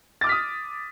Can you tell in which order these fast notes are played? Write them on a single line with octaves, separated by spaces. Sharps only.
A6 D6 F6 B6 D#6